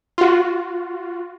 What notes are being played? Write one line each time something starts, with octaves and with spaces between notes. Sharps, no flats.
F4 F#4